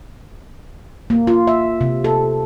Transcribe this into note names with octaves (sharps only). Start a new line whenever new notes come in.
A#3
F4
E5
C3
A4